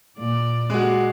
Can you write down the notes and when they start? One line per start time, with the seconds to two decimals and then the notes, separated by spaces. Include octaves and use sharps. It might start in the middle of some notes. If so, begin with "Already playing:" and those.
0.18 A#2 D5
0.70 G#3 F#4